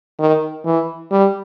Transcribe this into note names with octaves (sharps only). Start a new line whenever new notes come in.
D#3
E3
G3